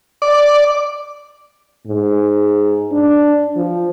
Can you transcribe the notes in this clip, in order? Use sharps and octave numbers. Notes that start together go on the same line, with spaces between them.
D5
G#2
D4
F3